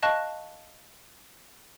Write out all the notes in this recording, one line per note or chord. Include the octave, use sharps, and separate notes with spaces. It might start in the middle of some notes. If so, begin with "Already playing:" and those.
D#5 F5 A5 C#6 F#6